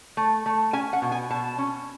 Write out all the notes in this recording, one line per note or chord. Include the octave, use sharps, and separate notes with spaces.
A3
A3
C#4 G#5
F#5
B2
G#5
B2 A5
C#4